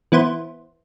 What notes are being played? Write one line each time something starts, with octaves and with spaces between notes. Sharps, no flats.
E3 B3 E4 C5